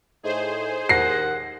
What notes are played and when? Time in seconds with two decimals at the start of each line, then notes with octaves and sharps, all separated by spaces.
0.23 A2 A3 D#4 G#4 C5
0.89 D#2 F#5 A#6 C7